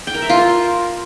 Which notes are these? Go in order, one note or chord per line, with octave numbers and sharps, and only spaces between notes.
G5
A#4
E5
F4
A#4